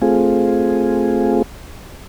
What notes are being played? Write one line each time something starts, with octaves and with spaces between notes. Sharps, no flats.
A3 C4 F4 G#4